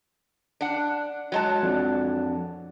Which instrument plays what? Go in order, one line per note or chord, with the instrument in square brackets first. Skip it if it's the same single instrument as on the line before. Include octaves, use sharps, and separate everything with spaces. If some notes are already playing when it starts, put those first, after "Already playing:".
[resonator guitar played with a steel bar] D4 F#5
F#3 G#3 A5
[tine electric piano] F2 D4